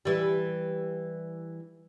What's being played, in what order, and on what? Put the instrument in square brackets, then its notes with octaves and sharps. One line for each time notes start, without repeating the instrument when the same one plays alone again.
[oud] E3 G3